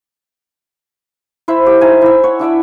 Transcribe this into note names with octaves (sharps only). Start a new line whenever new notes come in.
E4 C5 E5 B5
A3 G4
D#4 C5 E5 G#5
E4 E5
C#5 F#5
D4 E4 D5 E5